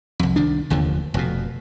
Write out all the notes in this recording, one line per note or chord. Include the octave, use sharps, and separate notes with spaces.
C2 F2
C2 D#3 D4
F1 D#2 D3 F3
F1 F2 B2